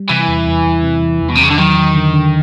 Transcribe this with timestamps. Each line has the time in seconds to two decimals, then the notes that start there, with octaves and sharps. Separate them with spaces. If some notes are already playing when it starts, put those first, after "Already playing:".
Already playing: G3
0.09 C3 E3
0.28 E2
0.46 E2
0.64 E2
0.83 C3
1.02 E2
1.21 E2
1.29 B2
1.36 C3
1.39 E2 C#3
1.51 D3
1.58 D#3 F#3
1.76 F#3
1.95 D3
2.14 D3